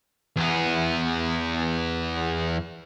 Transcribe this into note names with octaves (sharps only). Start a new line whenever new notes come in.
E2 B3